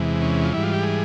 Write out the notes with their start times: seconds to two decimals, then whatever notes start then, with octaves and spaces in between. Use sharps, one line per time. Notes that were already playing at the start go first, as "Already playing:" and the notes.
Already playing: E2 C3 E3 G#3
0.22 C#4
0.45 F4
0.52 G#2 E3 G3 E4
0.63 F4
0.74 G4
0.83 G#4